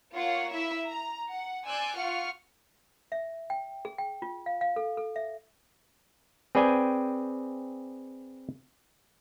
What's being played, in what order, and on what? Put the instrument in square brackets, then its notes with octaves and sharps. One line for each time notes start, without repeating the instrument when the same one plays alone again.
[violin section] A#3 F4 C#5 F#5
E4 E5
A#5
F#5
D5 G#5 C6 E6 F#6 G6
F4 F#5 C#6 F6 C#7
[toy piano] E5
G5
G#4
G5
F4
F5
F5
A4
A4
E5
[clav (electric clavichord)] C4 G#4 B4 D5 G5 G#5